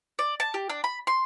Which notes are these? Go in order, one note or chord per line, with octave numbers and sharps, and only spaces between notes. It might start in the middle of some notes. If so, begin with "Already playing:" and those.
D5
A5
G4
D4
B5
C6